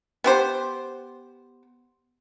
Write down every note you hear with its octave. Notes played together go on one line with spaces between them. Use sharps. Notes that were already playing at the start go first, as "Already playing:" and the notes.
B3 G4 C5